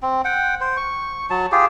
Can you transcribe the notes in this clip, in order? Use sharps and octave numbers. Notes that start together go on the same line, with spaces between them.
C4
F#5 G5
C5
C#6
F#3 A5
F4 G4 G#4